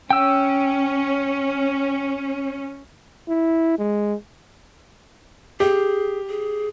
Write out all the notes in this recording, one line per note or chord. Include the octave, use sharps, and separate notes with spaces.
C#4 G5 E6
E4
G#3
G4 G#4
G#4